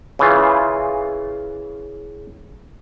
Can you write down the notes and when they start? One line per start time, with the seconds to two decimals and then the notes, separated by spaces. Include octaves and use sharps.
0.19 C#3 E3 F4